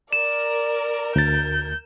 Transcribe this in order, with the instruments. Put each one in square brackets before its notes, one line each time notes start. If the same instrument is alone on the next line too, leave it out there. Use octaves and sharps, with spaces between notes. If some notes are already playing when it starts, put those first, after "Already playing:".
[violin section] A#4 [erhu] D5 [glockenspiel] E7
[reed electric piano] D2 A6 [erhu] G6